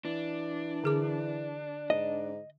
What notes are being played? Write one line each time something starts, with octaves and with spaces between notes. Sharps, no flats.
E3 D4
D3 G#4 D6
G#2 D#5